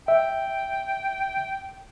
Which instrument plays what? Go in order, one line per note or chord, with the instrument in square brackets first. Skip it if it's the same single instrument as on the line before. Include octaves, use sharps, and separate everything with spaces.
[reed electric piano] E5 [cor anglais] G5